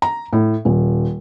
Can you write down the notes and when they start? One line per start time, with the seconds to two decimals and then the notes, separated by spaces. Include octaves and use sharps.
0.02 A#5
0.33 A2
0.65 D#1